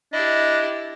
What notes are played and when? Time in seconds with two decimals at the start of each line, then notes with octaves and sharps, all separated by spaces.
0.13 D4 E4 G4 D#5